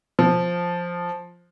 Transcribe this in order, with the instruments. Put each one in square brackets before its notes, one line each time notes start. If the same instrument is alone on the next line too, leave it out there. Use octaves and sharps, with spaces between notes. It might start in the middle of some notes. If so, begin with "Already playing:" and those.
[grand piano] F3